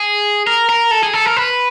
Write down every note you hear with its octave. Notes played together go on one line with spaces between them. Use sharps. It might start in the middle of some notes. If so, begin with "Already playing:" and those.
Already playing: G#4
A#4
A#4
A4
G#4
A4
A#4
B4